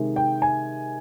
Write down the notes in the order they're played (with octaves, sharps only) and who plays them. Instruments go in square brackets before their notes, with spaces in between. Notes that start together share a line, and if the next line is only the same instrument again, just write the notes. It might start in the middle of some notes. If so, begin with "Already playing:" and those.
Already playing: [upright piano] C3 D#3 G#3
G5
G#5